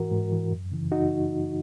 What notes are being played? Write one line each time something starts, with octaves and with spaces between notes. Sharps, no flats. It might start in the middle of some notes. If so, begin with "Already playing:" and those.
Already playing: G#2 E3 F#4 A#4
G#2
E3
F#2
C#3 E3
D#4 F#4